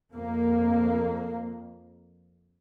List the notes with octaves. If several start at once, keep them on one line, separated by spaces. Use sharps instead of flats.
F2 A#3